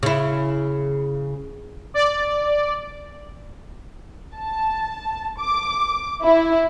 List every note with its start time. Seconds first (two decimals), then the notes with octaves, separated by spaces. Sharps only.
0.03 C#3 E4
1.94 D5
4.36 A5
5.39 D6
6.23 E4